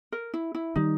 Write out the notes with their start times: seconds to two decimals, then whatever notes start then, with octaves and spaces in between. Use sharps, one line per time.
0.12 A#4
0.34 E4
0.55 E4
0.75 D#3 G3 D#4